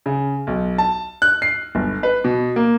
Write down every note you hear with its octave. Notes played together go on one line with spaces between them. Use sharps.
C#3
B1
A5
F#6
C7
G1
B4
B2
A#3